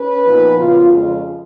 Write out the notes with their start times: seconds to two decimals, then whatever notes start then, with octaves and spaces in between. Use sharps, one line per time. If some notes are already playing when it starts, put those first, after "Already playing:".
Already playing: C#4 B4
0.24 A#2 F3 B3 D#4
0.56 F#2 C#3 F3 B3 F4
0.89 F2 C#3 G#3 F4